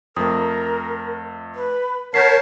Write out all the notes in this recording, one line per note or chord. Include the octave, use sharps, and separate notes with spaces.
F2 A3 A#4 D#6
B4
A#4 C#5 F#5 A5 G6 B6 C7